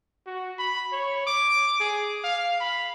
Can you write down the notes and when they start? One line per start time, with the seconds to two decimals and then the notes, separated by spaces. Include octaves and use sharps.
0.26 F#4
0.59 B5
0.92 C#5
1.26 D6
1.80 G#4
2.24 F5
2.60 B5